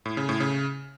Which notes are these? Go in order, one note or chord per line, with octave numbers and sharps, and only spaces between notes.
A2
C#3
A2
C#3